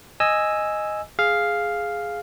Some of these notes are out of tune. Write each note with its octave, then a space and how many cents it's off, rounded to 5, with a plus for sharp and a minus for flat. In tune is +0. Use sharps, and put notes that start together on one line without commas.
D#5 +0 G#5 +0 E6 +0
G#4 +5 F5 +0